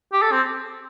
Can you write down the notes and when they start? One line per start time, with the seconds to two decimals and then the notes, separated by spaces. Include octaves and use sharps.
0.13 G4
0.22 A4
0.32 C4